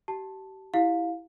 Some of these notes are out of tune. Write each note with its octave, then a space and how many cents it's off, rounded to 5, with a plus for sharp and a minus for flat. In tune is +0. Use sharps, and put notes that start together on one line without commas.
G4 -35 A5 +0
E4 +0 G4 +0 F5 +15